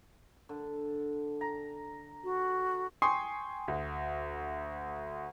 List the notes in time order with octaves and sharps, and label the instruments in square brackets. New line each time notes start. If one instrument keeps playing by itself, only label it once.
[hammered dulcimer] D3
A#5
[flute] F#4
[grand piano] G5 G#5 C6 C#6 D#6 C7
D2